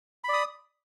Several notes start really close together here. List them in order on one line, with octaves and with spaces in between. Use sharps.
B5 D5 D#6